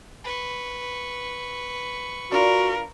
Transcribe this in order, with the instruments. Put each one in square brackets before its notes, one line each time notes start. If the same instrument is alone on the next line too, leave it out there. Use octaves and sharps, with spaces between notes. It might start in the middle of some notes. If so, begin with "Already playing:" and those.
[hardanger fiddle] B4 C#6
[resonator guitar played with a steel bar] D4 F4 [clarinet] F#4 [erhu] A#4